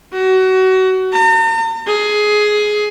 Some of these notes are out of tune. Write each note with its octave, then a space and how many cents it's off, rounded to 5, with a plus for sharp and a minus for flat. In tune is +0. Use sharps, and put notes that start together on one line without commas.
F#4 +25
A#5 -45
G#4 +15